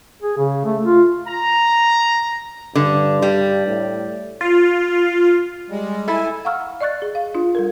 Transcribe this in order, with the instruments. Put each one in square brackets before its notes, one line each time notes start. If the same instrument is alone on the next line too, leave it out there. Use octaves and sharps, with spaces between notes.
[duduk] G#4
C#3
A3
F4
[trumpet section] A#5
[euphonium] G2 [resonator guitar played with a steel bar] D3
[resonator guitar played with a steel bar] G3
[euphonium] A2
[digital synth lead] F4
[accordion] G3 G#3
[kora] E4 A4 [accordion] G#5
[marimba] F5 F#5 A#5 C#6 E6 F6
D5 D#5 C#6 F#6 A6
G#4
F5
D4 F4
G3 A4 A#4